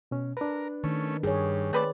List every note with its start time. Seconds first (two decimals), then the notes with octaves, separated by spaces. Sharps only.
0.11 B2 C#4
0.37 D4 A#4 B4
0.84 D#3 A3 C#4
1.23 G2 G#4 C#5
1.73 A3 C4 B4 D5